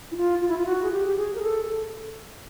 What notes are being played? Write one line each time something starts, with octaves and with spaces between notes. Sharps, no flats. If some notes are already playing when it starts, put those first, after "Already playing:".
E4
F4
F4
E4
F4
F#4
G#4
G4
G4
G#4
A#4
A4